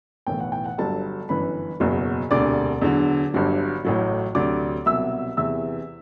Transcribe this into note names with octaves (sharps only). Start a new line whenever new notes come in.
B1 A2 E3 G5
F#5
G5
F#5
G1 G2 F#3 A4 A5
G1 F#2 E3 B4 B5
F#1 E2 B2 F#3
E1 D2 C3 D5 D6
E2 D3 F#3
G1 G2 F#3
A1 A2 F#3
D2 C3 F#3 D5 D6
C2 B2 F#3 E5 E6
E2 C3 E3 E5 E6